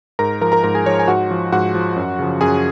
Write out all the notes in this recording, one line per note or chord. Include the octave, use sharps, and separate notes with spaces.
G#2 A#4 A#5
F3 A#4 A#5
A#4 A#5
G#2 A#4 A#5
G#4 G#5
F3 C#5
G#5
G#2 F#4 F#5
F3
G#2 F#4 F#5
F3
F#2
C#3 F3
F#2 G#4 G#5